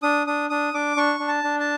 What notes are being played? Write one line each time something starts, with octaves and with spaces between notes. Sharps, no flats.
D4 D#6
D4 D#6
D4 D#6
D4 D6
D4 C#6
D4
A5
D4
A5